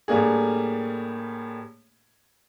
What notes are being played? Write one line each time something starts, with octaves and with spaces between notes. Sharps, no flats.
A2 G3 A3 A#3 D4 G#4